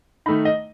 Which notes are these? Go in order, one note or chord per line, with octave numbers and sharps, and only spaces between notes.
D#3 A3 D#4 B5
D#5